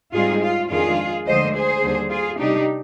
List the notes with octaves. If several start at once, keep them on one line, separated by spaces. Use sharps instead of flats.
G#2 G3 C4 D#4 F4 G#4
F4
F2 D#3 G#3 D4 F4 G#4
D2 D3 F3 G#3 C5 D#5
G#4 C5
D#2 D3 G3
F4 G#4
C3 G3 D4 D#4 G4